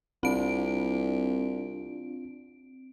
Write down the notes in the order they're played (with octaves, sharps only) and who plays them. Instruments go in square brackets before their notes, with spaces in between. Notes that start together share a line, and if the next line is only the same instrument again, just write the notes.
[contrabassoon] C2 [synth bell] C4 D7 [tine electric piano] D4 F4